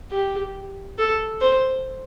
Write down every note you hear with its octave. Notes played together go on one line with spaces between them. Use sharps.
G4
A4
C5